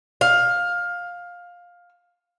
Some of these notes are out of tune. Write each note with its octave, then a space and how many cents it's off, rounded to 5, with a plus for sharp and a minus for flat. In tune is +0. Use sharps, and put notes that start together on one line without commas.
F5 +15